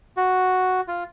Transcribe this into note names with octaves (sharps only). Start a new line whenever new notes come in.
F#4
F4